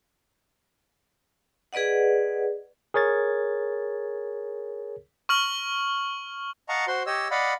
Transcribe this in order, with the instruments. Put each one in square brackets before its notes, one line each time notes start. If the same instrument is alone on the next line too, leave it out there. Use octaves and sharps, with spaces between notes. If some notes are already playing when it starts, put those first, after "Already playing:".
[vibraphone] G#4 B4 D5 D#5 F#5
[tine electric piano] G#4 A#4 C#5 G#6 A6
[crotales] C#6 F6 F#7
[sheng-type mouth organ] D#5 F5 F#5 A5 A#5 C#6
F#4 C5 C6
G4 C#5 D#5 E6
D5 D#5 F5 F#5 B5